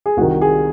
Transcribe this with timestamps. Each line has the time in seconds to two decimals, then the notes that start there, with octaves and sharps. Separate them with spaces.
0.06 G#4
0.17 C2 C3 D#3 F#4
0.41 G#4